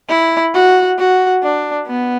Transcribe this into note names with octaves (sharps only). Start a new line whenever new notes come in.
E4
F#4
F#4
D4
B3